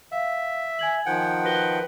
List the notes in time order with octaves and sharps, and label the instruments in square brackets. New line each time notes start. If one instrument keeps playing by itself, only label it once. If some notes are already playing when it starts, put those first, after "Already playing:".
[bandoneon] E5 [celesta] F5
[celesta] G#5 G#6 F#7
[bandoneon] D#3 F3 [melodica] F#5 G5
[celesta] F#4 A#6 G7 [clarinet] B4